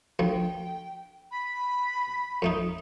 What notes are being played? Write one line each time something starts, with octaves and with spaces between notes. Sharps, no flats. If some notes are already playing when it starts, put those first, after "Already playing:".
D2 F3 G5
B5
F2 A3 D#4